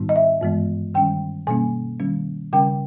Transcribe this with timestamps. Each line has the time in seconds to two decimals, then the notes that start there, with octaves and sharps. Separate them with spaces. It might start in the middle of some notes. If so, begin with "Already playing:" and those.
Already playing: G#2 D#3 G3 B3 D#4
0.09 D#5
0.16 E5
0.41 G2 E3 G#3 B3
0.95 D#3 G3 C#4 G5
1.47 B2 G3 A#3 C#4 G#5
2.00 D#3 G3 C#4
2.53 C#3 G3 C#4 G5